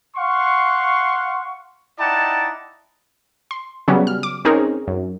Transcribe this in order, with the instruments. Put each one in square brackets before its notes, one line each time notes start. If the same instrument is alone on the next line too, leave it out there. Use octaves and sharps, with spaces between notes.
[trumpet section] F5 F#5 C6 C#6
D#4 E4 D5 F#5 G5 A5
[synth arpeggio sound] C6
C#3 F#3 G3 B3 C#4
F6
D6
C4 C#4 D#4 G#4 A#4 C#5
F#2